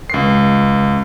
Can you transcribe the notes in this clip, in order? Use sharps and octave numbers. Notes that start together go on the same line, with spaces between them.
C#2 C7